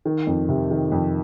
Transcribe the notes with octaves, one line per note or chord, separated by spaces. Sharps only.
D#3
F2
C3
D#3
F2